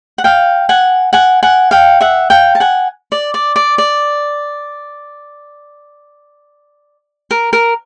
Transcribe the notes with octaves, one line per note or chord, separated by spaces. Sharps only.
F#5
F5 G5
F#5 G#5
F#5 G#5
F#5 G#5
F5 G5
E5 F#5
F5 G5
A5
F#5 G#5
D5
D5
D5
D5
A#4
A#4